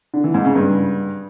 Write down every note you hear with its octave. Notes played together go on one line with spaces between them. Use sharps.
D3
E3
G#2
C#3
G2